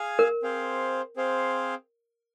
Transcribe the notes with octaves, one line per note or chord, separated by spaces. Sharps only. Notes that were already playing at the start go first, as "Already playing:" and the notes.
Already playing: G#4 F5 G#5
A#4
C4 G#4 C5 F5
C4 G#4 C5 F5